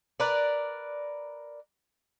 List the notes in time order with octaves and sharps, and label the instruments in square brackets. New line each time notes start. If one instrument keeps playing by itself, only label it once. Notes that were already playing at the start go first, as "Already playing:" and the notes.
[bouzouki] A#4 B4 D5